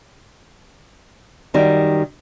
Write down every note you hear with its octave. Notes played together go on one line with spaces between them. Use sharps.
F#2 D#3 G3